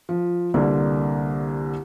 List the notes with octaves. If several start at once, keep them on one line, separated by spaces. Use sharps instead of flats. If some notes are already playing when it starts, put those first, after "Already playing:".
F3
C2 D3 A#3